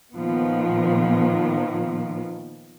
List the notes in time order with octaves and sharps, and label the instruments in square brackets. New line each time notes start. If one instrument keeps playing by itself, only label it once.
[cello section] A#2 D#3 F3 B3